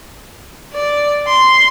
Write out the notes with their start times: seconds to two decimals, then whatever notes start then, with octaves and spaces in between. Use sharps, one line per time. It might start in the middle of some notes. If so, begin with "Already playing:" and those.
0.74 D5
1.27 C6